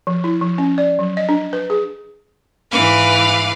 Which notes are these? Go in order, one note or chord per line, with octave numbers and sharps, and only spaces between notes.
F3
E4
F3
C#4
D5
F#3
D#5
D4
B4
G#4
G#2 E3 B4 F5 D6